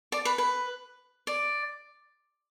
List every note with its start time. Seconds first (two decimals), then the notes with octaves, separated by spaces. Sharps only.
0.12 D5
0.25 B4
0.38 B4
1.27 D5